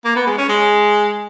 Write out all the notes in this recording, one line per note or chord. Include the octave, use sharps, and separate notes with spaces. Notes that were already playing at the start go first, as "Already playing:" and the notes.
A#3
B3
G#3
C#4
G#3